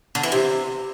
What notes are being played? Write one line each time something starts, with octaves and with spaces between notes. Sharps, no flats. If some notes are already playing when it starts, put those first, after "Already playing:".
D3
E3
C3